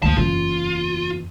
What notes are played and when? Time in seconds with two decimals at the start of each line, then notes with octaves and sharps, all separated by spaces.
0.03 D2 F3 A#3 A5
0.17 F#1 E2 F4